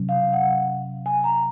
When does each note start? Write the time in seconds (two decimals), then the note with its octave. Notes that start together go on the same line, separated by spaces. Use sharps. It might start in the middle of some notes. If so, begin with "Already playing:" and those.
Already playing: C3 F#3 C#4
0.09 F5
0.33 F#5
1.06 G#5
1.24 A#5